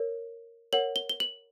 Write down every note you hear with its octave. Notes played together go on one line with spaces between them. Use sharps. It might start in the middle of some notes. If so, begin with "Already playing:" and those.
Already playing: A#4 C#5
A#4 C#5 F#5 F#7
G7
G7
F#7